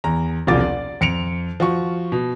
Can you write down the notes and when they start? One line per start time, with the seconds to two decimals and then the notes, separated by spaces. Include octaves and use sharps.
0.04 E2 A#5
0.47 E1 C2 F3 F4 D6 A6
0.61 D5
1.01 F2 C#7 D7 F7
1.60 F3 F#4 C#6
2.12 B2